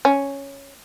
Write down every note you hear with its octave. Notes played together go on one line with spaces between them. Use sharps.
C#4